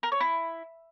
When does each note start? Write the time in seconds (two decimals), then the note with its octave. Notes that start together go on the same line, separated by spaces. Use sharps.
0.03 A#4
0.12 C#5
0.20 E4